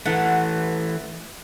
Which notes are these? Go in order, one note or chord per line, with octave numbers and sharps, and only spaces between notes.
E3 A3 F#5